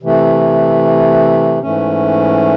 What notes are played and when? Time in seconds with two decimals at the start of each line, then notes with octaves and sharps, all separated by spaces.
0.02 C3 E3 A3
1.62 G#2 E3 A3 C#4